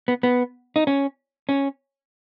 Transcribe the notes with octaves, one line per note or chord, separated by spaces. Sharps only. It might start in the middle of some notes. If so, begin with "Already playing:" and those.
B3
B3
D#4
C#4
C#4